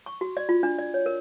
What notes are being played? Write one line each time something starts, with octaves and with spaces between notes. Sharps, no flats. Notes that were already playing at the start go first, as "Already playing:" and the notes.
C#6
F#4
D5
F4
D4
D5
C#5
A#4